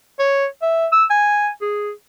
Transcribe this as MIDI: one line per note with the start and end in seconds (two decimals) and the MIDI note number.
0.19 0.46 73
0.62 0.87 76
0.92 1.05 88
1.10 1.50 80
1.62 1.91 68